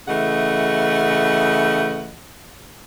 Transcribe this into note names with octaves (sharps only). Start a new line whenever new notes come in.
C#3 E3 A3 D#5 F#5